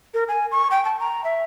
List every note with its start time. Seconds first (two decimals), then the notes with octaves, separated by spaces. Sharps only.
0.14 A#4
0.28 G#5
0.52 C#6
0.71 G5
0.85 A5
1.00 A#5
1.24 E5